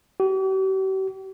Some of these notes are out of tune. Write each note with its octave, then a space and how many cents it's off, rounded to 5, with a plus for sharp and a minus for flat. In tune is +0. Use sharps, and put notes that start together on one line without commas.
G4 -45